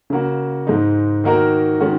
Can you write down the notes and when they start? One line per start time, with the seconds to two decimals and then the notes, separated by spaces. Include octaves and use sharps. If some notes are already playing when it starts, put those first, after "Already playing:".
0.10 C#3 A#3 F#4
0.67 G#2 G#3 D#4
1.24 D#3 A#3 D#4 F#4 A#4
1.80 D#3 G#3 C#4 F#4